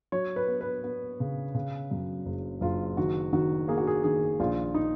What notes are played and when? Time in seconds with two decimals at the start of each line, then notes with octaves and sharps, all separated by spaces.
0.12 F#3 C#5
0.36 B4
0.48 B3
0.61 B4
0.84 B3
1.20 C#3
1.54 C#3
1.91 F#2
2.26 F#1
2.61 F#1 F4
2.97 D#3 F#4
3.33 D#3 F#4
3.68 A#3 G#4
3.78 F#4
3.87 G#4
4.04 D#3 G#4
4.40 A#1 F4
4.74 D#4